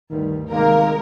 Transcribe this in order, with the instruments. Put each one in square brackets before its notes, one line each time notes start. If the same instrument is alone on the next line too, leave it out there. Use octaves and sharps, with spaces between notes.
[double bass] D2 G2 [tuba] D#3
[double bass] C3 G#3 [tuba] D#3 [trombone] A#3 [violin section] A#4